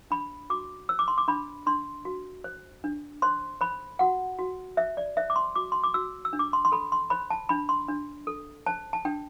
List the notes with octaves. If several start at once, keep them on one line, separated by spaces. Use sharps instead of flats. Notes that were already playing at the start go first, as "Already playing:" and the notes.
D4 B5
F#4 D6
C5 E6
D6
C6
D6
D4 B5
D4 C6
F#4
C5
D4
C5 C6
C5 B5
F#4 F#5
F#4
C5 E5
D5
C5 E5
D6
C6
F#4 D6
C6
D6
F#4 E6
E6
D4
D6
C6
C6
A4 B5
C6
C5 B5
A5
D4 B5
C6
D4
A4
C5 A5
A5
D4 G5